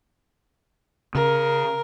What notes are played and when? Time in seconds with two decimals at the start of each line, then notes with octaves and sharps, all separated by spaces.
1.15 C#3 A#4